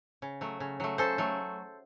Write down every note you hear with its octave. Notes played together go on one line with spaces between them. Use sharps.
C#3
F#3 A3
C#3
F#3 A3
C#3 A4 C5
F#3 A3